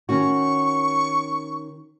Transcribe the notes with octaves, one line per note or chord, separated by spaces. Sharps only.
D#3 C#4 F#4 C#6